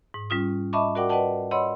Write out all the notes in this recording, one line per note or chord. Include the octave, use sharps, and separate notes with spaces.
G#2
G3 C#4 F4 D#6
D#5 E5 A5 B5 C#6 D6
F#4 A#4 D5 F#5 G5 D6
B4 D5 D#5 F#5 G5 A5
C#5 D#5 F#5 B5 C6 E6